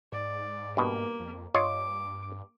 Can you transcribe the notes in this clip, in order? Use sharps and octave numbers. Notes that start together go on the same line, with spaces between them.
G#2 D5
G2 B2 A#3
F2
G2 F4 C#5 D#5 D6